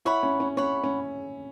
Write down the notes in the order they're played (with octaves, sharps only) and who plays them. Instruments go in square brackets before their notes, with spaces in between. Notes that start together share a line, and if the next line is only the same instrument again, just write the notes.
[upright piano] E4 [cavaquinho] C#5 F#5 B5
[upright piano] C#4
C#4
[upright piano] C#4 [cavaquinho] C#5 F#5 B5
[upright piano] C#4